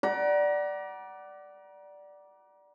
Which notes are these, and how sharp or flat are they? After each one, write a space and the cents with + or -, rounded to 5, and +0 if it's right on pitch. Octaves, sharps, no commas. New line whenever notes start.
D5 +0 F#5 +25 A#5 +35